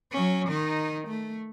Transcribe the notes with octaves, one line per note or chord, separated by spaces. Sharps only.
F#3 C#4
D#3 D#4
A3